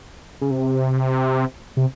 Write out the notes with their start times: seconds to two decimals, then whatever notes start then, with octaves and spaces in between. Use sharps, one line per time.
0.41 C#3
0.51 C3
1.77 C3